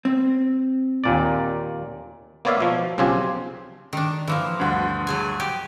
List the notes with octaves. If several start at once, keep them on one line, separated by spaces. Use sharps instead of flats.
C4
D#2 A#2 D5
A#3 B3 C#5 D5 E5 F5
B2 F3
B1 C#3 C4 F4 G4 G#5
D#3 D4
E3 F3 A#3
D2 G2
F#3 G#4 G#5
G4 G#5